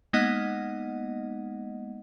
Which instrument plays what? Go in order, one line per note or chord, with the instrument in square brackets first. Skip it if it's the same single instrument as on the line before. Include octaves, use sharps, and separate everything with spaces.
[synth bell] G#3 A#3 B3 D#4 D#5 F#5